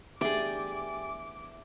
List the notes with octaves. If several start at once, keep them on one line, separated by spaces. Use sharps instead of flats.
E2 A3 D4 G4 G#4 D5 D6